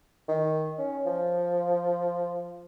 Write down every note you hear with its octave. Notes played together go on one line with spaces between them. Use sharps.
D#3
C#4
F3